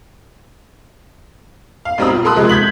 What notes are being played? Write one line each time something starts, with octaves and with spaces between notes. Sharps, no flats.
F5
B1 G3 C4 A#5 B5 D#6
F4
A4 A#4 B5 C6 D#6 F#6
C3 F3 G#3
G6 G#6 B6 F#7